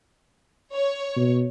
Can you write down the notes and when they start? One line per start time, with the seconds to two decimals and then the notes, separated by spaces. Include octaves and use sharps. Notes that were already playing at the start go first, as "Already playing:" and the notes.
0.73 C#5
1.16 B2